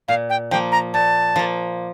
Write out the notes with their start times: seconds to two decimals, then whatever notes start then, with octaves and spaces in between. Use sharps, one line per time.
0.08 A#2 F5
0.30 G5
0.51 F3 A#3 G5
0.72 A#5
0.94 A#2 A5
1.36 F3 A#3